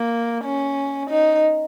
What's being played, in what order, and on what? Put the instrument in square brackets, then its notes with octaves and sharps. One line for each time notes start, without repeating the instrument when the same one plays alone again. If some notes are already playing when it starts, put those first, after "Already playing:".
Already playing: [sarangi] A#3
C#4
D#4